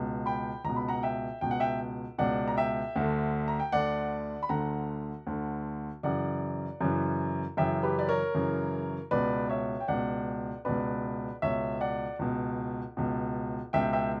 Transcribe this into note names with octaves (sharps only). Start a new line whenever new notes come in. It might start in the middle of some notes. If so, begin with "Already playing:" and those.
Already playing: C#2 B2
G5 B5
C#2 B2 A#5
B5
F#5 A#5
E5 G5
C#2 B2 G5
F#5
E5 G5
C#2 B2 D5 F#5
A#5
E5 G5
D2 D3
A#5
G5
D2 D3 D5 F#5
B5
D2 D3 F#5 A#5
D2 D3
F#2 C#3 E3 D5 F#5
F#2 C#3 E3
F#2 C#3 E3 E5 G5
G4 B4
D5
A#4 C#5
F#2 C#3 E3
C#2 B2 B4 D5
C#5 E5
G5
C#2 B2 D5 F#5
C#2 B2 B4 D5
C#2 B2 C#5 E5
D5 F#5
C#2 B2
C#2 B2
C#2 B2 E5 G5
E5 G5